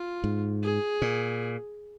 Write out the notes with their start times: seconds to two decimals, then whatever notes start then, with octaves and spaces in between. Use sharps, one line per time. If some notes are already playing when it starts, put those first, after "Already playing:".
Already playing: F4
0.24 G#2
0.63 G#4
1.02 A#2